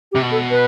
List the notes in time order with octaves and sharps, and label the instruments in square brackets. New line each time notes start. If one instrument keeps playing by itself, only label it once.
[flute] G4
[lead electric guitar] C3
B2
[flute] A4
B4